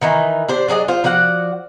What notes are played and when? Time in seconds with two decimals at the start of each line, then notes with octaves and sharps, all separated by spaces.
0.01 D#3 E3 D#4
0.49 D4 G4 C5
0.68 F#3 D4 G#4 D#5
0.88 F4 C5
1.04 F3 F#4 D5 F#5